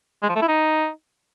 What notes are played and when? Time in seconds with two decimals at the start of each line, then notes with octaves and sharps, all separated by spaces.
0.23 G#3
0.29 F3
0.35 A3
0.41 E4
0.48 D#4